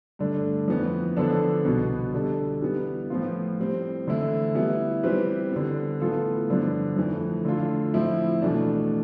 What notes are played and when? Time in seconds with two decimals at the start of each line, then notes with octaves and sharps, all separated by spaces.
0.19 G2 D3 A3 D4
0.68 F2 E3 B3
1.17 D3 F3 B3 D4 A4
1.65 C2 B2 B3
2.13 D3 G3 D4 A4
2.62 E3 G3 B3
3.10 A2 F3 B3 F4
3.59 A2 G3 C4
4.07 E2 D3 A3 E4
4.55 E3 G3 B3 E4
5.03 E3 G3 C4 G4 B4
5.52 D3 G3 B3
6.00 A2 E3 B3 F4 A4
6.48 G2 D3 F3 B3 D4
6.97 F2 E3 A3
7.45 D3 A3 D4 F4 A4
7.93 A2 F3 C4 E4
8.42 E2 B2 A3 D4